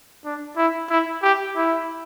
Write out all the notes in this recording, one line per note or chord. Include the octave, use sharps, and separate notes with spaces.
D4
E4
E4
G4
E4